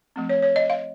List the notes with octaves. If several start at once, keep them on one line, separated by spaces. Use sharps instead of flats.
F3 A3 C4
C#5
C#5
D#5
F5